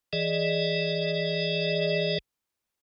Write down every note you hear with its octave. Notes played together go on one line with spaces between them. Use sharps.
E3 G#4 D5 D#5